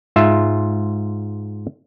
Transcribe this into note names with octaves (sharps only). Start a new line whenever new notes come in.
G#2 F4 E5